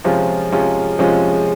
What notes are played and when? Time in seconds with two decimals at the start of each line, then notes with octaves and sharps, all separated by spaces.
0.04 C3 F3 G#3 C#4 F4
0.52 C3 F3 G#3 C#4 F4
0.99 C3 F3 G#3 C#4 F4